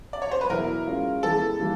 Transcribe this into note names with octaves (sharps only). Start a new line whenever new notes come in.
D5
C#5
C5
B4
E2 B2 F#3 B3 E4 A#4
G#3 C#4 F4
E3 G#3 B3 A4
E3 G3 A#3